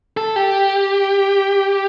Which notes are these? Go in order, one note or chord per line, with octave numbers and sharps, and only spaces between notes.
A4
G4